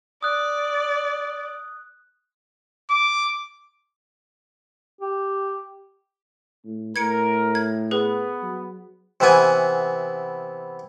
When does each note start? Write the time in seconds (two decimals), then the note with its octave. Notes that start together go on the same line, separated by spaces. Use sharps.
0.23 D5 D#6 F#6
2.90 D6
5.01 G4
6.64 A2
6.96 A2 A#4 G#6 C#7 D7
7.55 G#6
7.91 B3 G#4 B4
8.42 F#3
9.20 C3 E3 B3 G#5